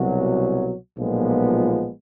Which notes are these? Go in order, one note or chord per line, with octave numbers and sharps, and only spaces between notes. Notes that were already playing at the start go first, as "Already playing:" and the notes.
Already playing: C2 B2 F#3
B1 A#2 F3 G#3 B3